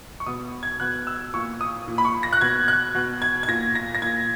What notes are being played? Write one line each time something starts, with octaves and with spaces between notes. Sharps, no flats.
C#6
B2 D#6
G#6
B2 F#6
E6
A#2 C#6
D#6
A#2
B5
C#6
A#6
F#6
B2 G#6
F#6
B2
G#6
G#6
A#2 A#6
A#6
A#6
A#2 G#6